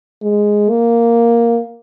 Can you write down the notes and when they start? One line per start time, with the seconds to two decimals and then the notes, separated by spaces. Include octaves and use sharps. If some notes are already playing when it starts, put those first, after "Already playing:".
0.23 G#3
0.70 A#3